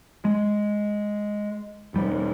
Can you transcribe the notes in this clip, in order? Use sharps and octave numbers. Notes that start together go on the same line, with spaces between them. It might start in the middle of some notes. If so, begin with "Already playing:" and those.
G#3
E1 G3